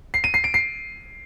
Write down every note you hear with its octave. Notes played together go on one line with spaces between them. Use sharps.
C7
D#7
C7
D7
C7